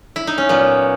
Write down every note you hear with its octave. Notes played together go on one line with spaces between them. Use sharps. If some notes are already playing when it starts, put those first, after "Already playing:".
E4
D#4
C#4
A#2 F#3 B3